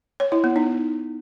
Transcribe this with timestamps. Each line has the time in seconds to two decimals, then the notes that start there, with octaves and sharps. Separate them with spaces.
0.20 C#5
0.32 E4
0.44 B3
0.56 D#4